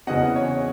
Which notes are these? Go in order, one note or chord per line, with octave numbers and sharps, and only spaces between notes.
E2 C#3 E3 C4 D#5 F#5
C#5